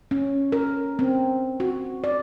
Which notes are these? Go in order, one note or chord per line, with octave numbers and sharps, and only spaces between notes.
C#4
A#4
C4
F#4
D5